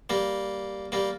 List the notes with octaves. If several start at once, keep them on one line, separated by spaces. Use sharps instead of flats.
G3 A#3
G3 A#3